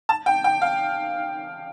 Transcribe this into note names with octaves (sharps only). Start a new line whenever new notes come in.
A5
G5
G5
F5